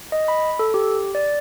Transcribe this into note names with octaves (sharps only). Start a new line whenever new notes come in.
D#5
B5
A4
G4
D5